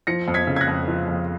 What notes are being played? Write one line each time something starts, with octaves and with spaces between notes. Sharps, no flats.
F3 A#6 C#7
F2
G#6 B6
C#3
G#6
F#6 A#6
F2
F3
F2